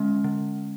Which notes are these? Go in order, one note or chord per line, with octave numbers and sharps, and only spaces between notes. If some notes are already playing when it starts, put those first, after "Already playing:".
Already playing: D3 G#3 C#4
D3